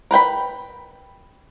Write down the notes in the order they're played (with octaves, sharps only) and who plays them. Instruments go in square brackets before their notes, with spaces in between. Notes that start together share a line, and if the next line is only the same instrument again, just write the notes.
[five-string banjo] A#4 B4 G5 B5